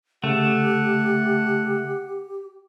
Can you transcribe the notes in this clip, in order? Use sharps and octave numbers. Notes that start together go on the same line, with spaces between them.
C#3 A3 G4 F#5